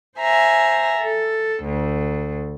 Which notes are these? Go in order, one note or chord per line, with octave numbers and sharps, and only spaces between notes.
C5 E5 G#5 A#5
A4
D2